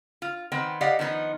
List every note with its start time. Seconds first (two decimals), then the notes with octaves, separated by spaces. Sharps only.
0.22 F4
0.52 D#3 B3 C4
0.81 G4 D5 D#5 F5 F#5
0.99 D#3 F3 B3 D#4